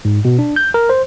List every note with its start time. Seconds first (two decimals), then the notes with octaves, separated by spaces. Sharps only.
0.05 G#2
0.25 B2
0.39 D4
0.56 G6
0.74 A#4
0.89 C5